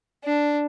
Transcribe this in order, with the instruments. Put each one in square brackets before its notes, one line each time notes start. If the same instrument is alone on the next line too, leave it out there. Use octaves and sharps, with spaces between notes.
[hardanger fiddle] D4